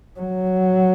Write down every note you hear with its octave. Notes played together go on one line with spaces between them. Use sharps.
F#3